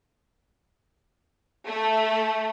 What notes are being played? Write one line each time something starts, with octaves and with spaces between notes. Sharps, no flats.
A3